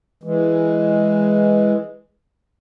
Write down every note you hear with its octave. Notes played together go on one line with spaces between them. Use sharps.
E3 G#3